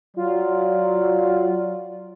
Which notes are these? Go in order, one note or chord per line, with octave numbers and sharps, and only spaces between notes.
F#3 F4 D5